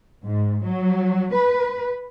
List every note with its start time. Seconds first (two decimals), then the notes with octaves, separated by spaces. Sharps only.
0.24 G#2
0.64 F#3
1.33 B4